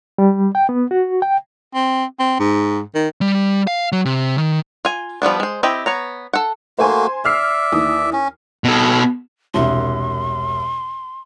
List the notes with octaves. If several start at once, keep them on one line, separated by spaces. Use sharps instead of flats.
G3
G5
B3
F#4
G5
C4
C4
G#2
D#3
G3
F5
F#3
C3
D#3
F4 G#5
F3 G3 B3 D4
G#3 C5
C4 E4 G4 D#5
B3 C#5 A#5
A4 F#5
A3 A#3 F#4 C5 G#5 C6
D5 E5 E6 F6 C7
D#2 E3 D#6
C#4
B2 A4
E1 C2 C6